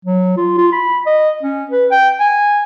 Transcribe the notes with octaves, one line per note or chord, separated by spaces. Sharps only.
F#3
F4
F4
B5
D#5
C#4
B4
G5
G#5